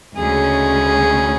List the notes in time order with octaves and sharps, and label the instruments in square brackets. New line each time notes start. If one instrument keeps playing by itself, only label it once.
[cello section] D2 C#3 G#3 C#4 [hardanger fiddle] G#4